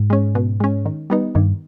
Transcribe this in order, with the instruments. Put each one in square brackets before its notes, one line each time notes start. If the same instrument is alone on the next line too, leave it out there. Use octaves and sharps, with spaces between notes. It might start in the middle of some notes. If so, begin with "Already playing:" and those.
Already playing: [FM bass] G#2
[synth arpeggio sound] G#3 C#4
B2
G#3 C#4
D#3
G3 B3 D#4
[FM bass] G2 [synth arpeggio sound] D#3